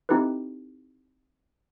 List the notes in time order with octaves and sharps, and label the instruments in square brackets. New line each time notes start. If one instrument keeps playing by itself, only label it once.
[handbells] C4 D#4 E4 G4 A4 B4